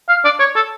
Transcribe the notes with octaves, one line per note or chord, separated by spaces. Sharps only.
F5
D5
C#5
A4